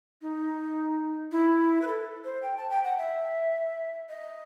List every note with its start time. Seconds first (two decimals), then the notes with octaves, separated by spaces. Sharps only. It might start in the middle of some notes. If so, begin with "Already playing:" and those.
0.22 D#4
1.31 E4
1.82 B4
1.87 A4
2.24 C5
2.43 G5
2.57 A5
2.70 G5
2.84 F#5
2.98 E5
4.09 D#5